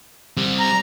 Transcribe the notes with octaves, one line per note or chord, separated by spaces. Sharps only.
G3 C4
A#5